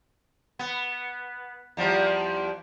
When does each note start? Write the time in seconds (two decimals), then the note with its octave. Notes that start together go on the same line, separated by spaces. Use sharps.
0.59 B3
1.77 E2 F3 G3